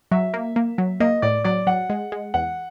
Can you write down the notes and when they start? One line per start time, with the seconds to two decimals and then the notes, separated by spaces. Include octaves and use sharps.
0.11 F#3 E5
0.34 A#3
0.56 A#3
0.78 F#3
1.00 A#3 D#5
1.22 A2 D5
1.44 F#3 D5
1.67 F#3 F#5
1.90 G#3
2.12 G#3
2.34 E2 F#5